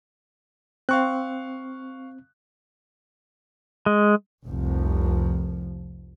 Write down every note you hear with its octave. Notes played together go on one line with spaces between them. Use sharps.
C4 F5 C#6 F#6
G#3
F1 C2 F3